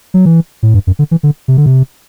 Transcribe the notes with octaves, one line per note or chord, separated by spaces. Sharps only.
F#3
E3
A2
G2
F#2
D3
E3
D3
C3
D3
C3